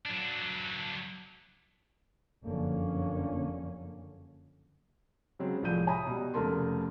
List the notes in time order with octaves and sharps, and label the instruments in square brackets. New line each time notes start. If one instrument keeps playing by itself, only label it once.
[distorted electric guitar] F#3 D4
[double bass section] F#1 F2 D3 A#3 C#4
[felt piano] C#3 F#3 G#3 C4
C2 A2 F3 G#3 G6 D#7
C#5 E5 G#5 A#5 B5 D#6
B2 G3
F1 C#3 A3 A#4 A5 C6